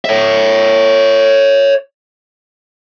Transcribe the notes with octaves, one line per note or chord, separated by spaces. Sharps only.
C#5 E5